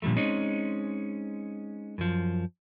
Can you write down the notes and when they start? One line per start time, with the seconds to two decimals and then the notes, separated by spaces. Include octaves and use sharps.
0.02 A#2 D3 F3 G3 A3
0.17 G#3 C4 C#4 D#4
1.98 F#2 F3